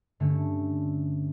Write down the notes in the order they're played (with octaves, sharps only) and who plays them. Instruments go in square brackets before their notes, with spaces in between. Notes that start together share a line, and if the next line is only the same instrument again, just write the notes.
[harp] G2 D3 A3 C#4